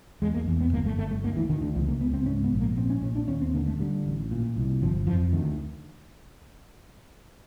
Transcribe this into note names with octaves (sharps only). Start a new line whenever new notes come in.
E2 G#3
A#3
E2
B3
G1 A#3
A3
G1 A3
A3
D2 A#3
E3
D2 D#3
D3
C#2 F3
A#3
C#2 B3
C4
G#2 C#4
B3
A#1
A#3
A#2 C4
C#4
A#2 C#4
D4
D#2 C#4
C4
D3 A#3
A3
D3 G3
A1
A#2
C2
G1 F3
F2 F3
D2 D#3